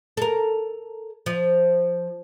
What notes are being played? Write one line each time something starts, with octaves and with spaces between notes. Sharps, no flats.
A4 A#4
F3